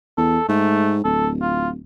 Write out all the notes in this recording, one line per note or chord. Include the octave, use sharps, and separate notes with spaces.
E2 A4
G#2 A3
D1 A4
F4